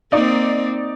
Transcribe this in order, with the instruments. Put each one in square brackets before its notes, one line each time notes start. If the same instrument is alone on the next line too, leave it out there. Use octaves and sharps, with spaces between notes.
[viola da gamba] A#3 C4 [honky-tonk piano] D#4 D5